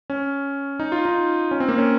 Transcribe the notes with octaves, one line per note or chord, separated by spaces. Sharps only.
C#4
D#4
F4
D#4
C#4
C4
A#3
C#4